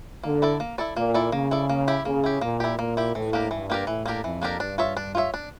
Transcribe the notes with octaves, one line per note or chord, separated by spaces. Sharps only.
D3 A#3
E4 A4 D5
A#3
E4 A4 D5
A#2 A#3
E4 A4 D5
C#3 A#3
E4 A4 D5
A#3
E4 G4
C#3 A#3
E4 G4
A#2 A#3
E4 G4
A#2 A#3
E4 G4
A2 E3
A#3 D4 G4 A#4
G2 E3
A#3 D4 G4 A#4
A2 E3
A#3 D4 G4 A#4
F2 E3
A#3 D4 G4 A#4
G2 D4
F4 C#5 E5
D4
F4 C#5 E5
D4